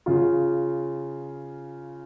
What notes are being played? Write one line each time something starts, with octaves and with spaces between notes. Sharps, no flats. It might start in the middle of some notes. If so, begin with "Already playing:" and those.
C#3 F4